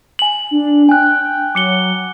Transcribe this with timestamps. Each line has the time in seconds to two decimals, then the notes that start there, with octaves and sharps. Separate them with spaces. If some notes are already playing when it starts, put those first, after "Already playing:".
0.19 G#5 F#7
0.51 D4
0.89 G5 G#5 F#6
1.55 F#3 D6 C#7 G7